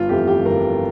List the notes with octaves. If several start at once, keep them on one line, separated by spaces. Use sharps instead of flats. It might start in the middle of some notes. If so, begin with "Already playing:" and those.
Already playing: G1 F4
F2 E3 A3 G4
G4
G1 A#4